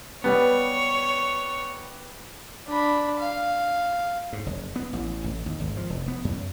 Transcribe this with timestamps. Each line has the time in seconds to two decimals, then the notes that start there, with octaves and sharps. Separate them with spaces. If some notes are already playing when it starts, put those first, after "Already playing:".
0.24 G3 B3 C#5
2.68 D4 B5
3.20 F5
4.33 G#2
4.46 F#1
4.76 B3
4.93 A1
5.24 A1
5.46 D#2
5.60 G#1
5.77 F3
5.90 F1
6.08 B3
6.25 F#2